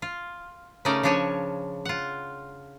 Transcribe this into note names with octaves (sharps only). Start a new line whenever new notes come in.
F4
C#3 A3 C#4 D#4 A#4 D5
C#3 F3 D4 C#5 G#5
F4 F#5